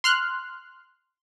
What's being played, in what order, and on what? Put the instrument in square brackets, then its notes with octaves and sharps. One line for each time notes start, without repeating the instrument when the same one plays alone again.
[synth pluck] C6 F6 F#6